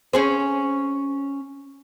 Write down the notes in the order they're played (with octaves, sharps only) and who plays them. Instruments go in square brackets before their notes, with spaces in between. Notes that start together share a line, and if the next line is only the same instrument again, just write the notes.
[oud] C#4 G#4 C5